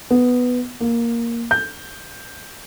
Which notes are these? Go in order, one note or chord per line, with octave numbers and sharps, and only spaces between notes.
B3
A#3
G6